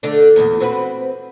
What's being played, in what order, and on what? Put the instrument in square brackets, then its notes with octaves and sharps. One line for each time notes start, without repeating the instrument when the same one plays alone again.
[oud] D3 A3 D4
E2 A#2
C4 F#4 B4